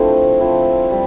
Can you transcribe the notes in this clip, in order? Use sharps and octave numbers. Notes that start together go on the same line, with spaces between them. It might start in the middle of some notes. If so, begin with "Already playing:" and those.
Already playing: F3 A3 C4 D4 E4
F3 C4 E4
G3